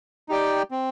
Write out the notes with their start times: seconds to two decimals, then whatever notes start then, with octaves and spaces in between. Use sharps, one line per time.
0.29 D#4 G4 D5 G5
0.71 C4